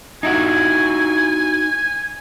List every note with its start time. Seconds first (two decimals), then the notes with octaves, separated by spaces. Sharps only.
0.23 D#4 E4 F#4 G#5